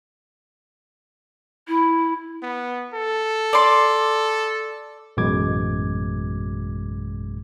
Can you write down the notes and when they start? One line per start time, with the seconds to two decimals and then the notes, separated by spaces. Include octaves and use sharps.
1.68 E4
2.43 B3
2.94 A4
3.53 D5 C6
5.17 A1 F#2 B2 G#3 D6 G#6